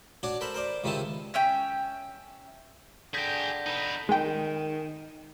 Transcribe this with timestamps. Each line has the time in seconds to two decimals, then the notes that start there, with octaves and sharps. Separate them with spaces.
0.23 D4 F#4 C#5 D5
0.41 A4 A#4 C5 B5
0.54 A#4 C5 D5
0.84 C#2 C3 D#3 C4 E4 A5
1.34 C#4 E5 G5
3.14 D3 G#4 G5 G6 A#6 B6
3.67 D#4 B4
4.09 D#3 G#3 G5